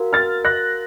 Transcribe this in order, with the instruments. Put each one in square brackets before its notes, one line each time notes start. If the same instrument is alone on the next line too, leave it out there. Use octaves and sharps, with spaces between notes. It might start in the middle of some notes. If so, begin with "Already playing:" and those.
Already playing: [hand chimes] F#4 A#4 F5
[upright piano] F6 A6
F#6 A#6